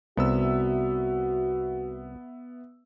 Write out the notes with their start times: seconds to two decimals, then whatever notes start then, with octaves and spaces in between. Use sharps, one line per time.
0.17 C2 B3 F#4 E5 E6